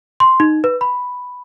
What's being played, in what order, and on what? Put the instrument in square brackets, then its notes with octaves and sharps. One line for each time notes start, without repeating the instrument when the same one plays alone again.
[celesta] C6
D#4
B4
B5